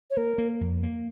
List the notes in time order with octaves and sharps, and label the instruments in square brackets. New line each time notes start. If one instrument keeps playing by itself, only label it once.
[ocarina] C#5
[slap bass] A#3 [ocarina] A#4
[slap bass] A#3
F2
A#3